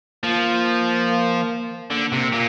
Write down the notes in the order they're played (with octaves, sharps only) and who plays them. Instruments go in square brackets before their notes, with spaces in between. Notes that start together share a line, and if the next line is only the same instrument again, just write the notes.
[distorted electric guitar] F3 [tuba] A#3
[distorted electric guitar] D3 [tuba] A#3
[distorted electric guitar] C3
A#2